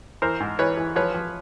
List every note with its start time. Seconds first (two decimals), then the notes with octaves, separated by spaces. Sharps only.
0.22 E3 A#4 C5
0.40 G#2
0.59 E3 B4 C#5
0.77 E3
0.96 F3 B4 C#5
1.14 F3